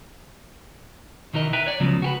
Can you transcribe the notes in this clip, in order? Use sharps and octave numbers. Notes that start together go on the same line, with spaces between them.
B2 D#3 E3 A#4 D#5
B4 E5 G5 A#5
C#5 D5
C#2 C#3 F3 F#3 B3
F#4 G4 B4